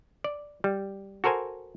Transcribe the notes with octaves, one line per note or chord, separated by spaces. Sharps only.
D5
G3
F#4 A4 A#4 C5 G#5